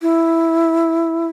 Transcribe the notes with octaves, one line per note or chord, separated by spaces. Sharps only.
E4